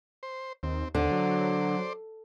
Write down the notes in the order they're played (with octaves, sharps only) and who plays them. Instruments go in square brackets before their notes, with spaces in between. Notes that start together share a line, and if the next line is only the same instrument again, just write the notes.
[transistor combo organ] C5
[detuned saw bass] D#2 [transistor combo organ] C4
[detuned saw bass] D#2 [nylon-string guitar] D3 [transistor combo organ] C5 D5
[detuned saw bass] F#3